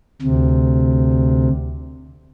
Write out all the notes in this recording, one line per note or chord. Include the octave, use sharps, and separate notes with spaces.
D2 C3